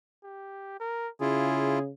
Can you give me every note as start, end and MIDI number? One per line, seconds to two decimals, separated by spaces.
0.23 0.76 67
0.80 1.08 70
1.21 1.91 49
1.21 1.79 64
1.21 1.79 65
1.21 1.83 68